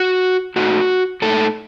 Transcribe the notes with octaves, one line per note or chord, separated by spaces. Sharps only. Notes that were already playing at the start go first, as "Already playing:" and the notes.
Already playing: F#4
A#2 A3 D#4 F#4
A#2 A3 D#4 A4